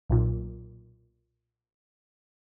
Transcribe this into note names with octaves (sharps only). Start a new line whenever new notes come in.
B1 A#2